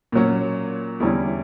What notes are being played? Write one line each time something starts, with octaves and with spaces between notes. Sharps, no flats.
A#2 F#3 C#4
E2 D3 G3 C#4 E4